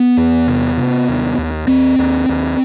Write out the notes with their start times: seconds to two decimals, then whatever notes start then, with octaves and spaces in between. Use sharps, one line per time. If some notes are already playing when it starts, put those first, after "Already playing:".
Already playing: B3
0.17 E2
0.48 C3
0.77 C3
1.08 D#2
1.38 D#2
1.68 D#2 C4
1.99 D#2
2.29 D#2